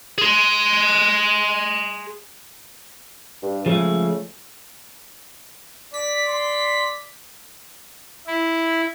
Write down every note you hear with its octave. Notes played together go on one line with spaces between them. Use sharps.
G#4 C6
G2
C#3 F3 G#3 A3
D5 B6
C6
E4